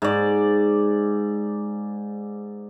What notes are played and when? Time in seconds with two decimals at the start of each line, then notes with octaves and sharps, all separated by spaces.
0.02 G#2 D5